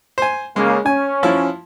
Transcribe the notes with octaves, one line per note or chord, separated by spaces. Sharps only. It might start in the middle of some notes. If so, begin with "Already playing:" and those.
C5 G#5
C#3 G#3 A#3
C#4 G#5
F3 E4